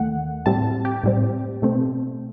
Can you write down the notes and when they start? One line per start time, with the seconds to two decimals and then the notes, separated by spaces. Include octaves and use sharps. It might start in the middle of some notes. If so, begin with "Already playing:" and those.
Already playing: D#2 D#3 A3 F#5
0.46 A2 G3 C4 A5
0.85 G4
1.04 A2 G3 C4
1.62 B2 A3 C4